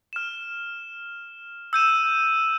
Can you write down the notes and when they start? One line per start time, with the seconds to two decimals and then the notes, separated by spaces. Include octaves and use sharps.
0.13 F6 E7
1.73 E6 G6 D#7 E7